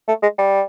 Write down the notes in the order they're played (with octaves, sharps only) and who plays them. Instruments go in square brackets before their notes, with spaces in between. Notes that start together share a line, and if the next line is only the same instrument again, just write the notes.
[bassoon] A3
G#3
G3